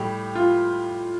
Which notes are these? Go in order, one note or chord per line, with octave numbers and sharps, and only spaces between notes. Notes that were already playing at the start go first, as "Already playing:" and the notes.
Already playing: A2 G3 G4
F4